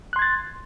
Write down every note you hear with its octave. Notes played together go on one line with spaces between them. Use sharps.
C6 F#6 G#6 A6